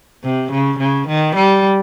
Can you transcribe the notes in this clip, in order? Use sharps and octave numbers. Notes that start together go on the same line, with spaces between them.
C3
C#3
C#3
D#3
G3